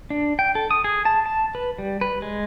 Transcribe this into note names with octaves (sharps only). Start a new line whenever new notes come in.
D4
G5
A4
D#6
G#4
A5
A5
B4
G3
B4
G#3